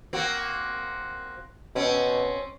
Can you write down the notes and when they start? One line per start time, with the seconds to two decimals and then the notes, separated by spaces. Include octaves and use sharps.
0.13 A#3 C4 F#4
1.76 B2 C4 C#4